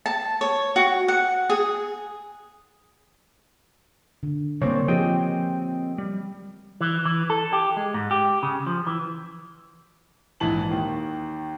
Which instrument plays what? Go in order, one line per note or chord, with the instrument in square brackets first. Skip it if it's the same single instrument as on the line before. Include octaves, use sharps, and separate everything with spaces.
[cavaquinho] A5
C#5
F#4
F#5
G#4
[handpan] D3
[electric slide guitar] C#3 G3 C4 [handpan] A#3 C5 C#5
[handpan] F3 G4 G#4 [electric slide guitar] C4 D#5 G5
[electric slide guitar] G3
[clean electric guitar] E3
E3
A4
G4
G#3
G#2
G4
C#3
F3
E3
[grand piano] A#1 G#2 E3 A5 F#7
D#2 D#3